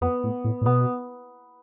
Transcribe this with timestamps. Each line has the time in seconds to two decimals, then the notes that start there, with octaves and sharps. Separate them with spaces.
0.01 F2 B3
0.24 A2
0.44 A2
0.61 A2
0.66 B2 B3